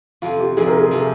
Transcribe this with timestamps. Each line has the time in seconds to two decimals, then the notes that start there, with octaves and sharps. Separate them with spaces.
0.22 F2 C3 F3 F4
0.40 G4
0.57 F2 C3 F3 G#4
0.68 A#4
0.80 G#4
0.91 C3 F3